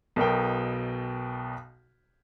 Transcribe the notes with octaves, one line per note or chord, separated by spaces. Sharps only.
B1 B2 A#4 G5